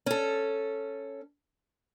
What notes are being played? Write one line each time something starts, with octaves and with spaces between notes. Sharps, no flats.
C#4 A4